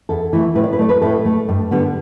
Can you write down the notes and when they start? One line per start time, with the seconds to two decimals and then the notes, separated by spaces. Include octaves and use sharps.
0.09 E2 A4
0.33 E3 A3
0.55 A2 B4
0.64 D5
0.73 B4
0.79 A3 D5
0.89 B4
1.01 A2 A4
1.25 A3
1.49 G2
1.71 D3 G3 B3